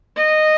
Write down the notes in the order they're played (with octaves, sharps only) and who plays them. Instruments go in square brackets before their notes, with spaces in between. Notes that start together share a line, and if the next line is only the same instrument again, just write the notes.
[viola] D#5